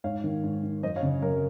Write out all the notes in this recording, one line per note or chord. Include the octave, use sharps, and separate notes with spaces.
G#2 C#5 F5
D#3
G#2
D#3
F#2 C5 D#5
C#5 F5
C#3
F#2 A#4 C#5